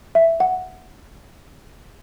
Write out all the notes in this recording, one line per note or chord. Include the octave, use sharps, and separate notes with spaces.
E5
F#5